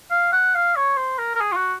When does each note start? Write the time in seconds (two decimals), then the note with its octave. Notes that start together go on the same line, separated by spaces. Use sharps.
0.11 F5
0.32 F#5
0.54 F5
0.76 C#5
0.97 C5
1.18 A#4
1.35 A#4
1.40 G#4
1.52 F4
1.56 F#4